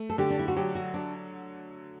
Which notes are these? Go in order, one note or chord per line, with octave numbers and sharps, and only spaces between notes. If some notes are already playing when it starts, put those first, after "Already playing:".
Already playing: A3
A4
D3 G4
D4
E4
F#4
F#3 G4
F#4
D4